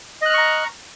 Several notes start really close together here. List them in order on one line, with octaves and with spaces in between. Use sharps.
D#5 F#6 F6 C#6 A#5